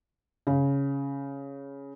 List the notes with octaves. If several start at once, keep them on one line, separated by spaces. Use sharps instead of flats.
C#3